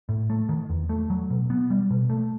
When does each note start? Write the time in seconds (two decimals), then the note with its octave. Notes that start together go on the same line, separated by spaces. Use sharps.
0.09 A2
0.30 A3
0.49 D#3
0.69 E2
0.89 A3
1.10 F#3
1.30 B2
1.50 B3
1.70 G3
1.90 B2
2.10 A3